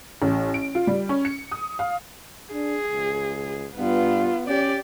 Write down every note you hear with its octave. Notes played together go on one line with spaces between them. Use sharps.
A1
D7
F4
G3
C#4
C#7
D#6
F5
D4 G#4
C#2
G2 B3 F4
C#4 G4 D5